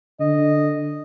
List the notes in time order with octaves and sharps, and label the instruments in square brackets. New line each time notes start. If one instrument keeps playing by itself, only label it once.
[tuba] D3 [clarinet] D#5